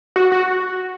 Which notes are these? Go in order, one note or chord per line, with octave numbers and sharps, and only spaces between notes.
F#4
F#4